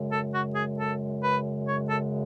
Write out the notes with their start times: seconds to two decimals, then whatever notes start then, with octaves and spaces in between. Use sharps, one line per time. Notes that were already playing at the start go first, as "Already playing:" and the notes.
Already playing: F#2 C#3 G#3
0.11 A4
0.34 F#4
0.55 G#4
0.78 A4
1.23 B4
1.67 C#5
1.89 A4